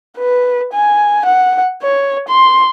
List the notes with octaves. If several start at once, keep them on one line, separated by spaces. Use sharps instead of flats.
B4
G#5
F#5
C#5
C6